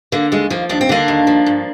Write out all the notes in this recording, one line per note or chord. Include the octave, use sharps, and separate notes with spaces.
D3 A#3
D#2 G#3
F3 A#3
D#2 D4
C4
D3 A#3 D4
D#2
F3
G2